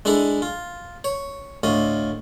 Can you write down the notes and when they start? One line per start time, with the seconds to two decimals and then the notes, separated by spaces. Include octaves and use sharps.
0.05 G#3 D4 E4 G#4 A4
0.42 F4
1.04 C#5
1.63 D2 A2 F4 D#5